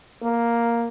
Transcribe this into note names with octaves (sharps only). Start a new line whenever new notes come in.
A#3